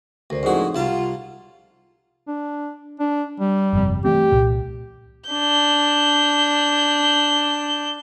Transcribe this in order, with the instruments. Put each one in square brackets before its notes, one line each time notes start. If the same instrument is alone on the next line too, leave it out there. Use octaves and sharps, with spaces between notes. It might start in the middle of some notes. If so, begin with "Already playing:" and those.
[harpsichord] D2 [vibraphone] A#4 C5 D5
[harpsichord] F2 F#4 [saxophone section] A2 C#3 G#3 [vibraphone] C4 D#4
[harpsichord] C2 A5 A#5 [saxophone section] F4 [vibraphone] F#5
[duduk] D4
D4
G3
[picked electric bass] G1 F2 C3
[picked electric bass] E3 A3 C4 [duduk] G4
[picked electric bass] C2 A#2
[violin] D4 G6